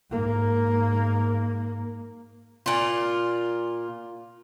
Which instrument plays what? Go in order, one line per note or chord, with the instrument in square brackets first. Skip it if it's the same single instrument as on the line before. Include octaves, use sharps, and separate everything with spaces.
[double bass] G#2 A#3
[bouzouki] A#2 F4